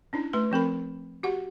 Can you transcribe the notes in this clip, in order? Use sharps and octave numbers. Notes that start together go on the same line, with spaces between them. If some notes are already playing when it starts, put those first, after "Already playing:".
C#4 D4 E4
A3 B4 C6
F3 C4 A#4 B5
F#4 G4 F#5